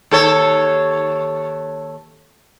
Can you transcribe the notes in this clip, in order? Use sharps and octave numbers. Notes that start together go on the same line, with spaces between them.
D#2 A4 C#5